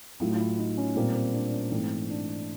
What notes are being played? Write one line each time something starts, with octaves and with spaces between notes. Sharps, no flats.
A2 F#3 A3 F4
F4
E4
D#4
C#4
A#2 G3 A#3 C4
C4
D4
C#4
G#2 E3 A3 C4
D4